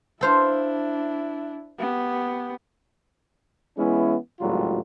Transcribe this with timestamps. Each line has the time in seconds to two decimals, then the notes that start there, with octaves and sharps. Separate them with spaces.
0.21 D4 E4 A4 C5 F5
1.79 B3 G4
3.78 E3 G#3 B3 C#4 E4
4.40 G#1 C#2 A2 F#3 G3 F4